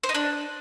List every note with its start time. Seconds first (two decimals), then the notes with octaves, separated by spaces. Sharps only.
0.03 C5
0.09 D#4
0.15 D4